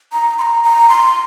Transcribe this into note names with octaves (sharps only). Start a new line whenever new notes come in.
A#5
C6
A#5
A#5
C6